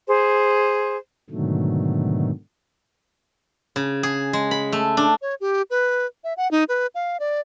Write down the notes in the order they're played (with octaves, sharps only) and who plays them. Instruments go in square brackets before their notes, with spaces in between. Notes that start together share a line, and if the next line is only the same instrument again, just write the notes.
[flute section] G#4 C5
[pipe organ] G#2 B2 D3 D#3 F#3 A3
[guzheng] C#3
G#4
G#3
B5
A3
D4
[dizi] C#5
G4
B4
E5
F#5
D#4
B4
F5
D5